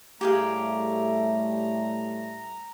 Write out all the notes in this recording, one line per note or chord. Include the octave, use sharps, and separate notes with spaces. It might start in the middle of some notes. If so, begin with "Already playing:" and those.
A2 G3 A3 G4 G#4 F5 A#5